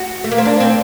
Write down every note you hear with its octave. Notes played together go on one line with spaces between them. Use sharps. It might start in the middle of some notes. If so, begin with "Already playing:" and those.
Already playing: F#4
A3
A#3
C4
D4
C4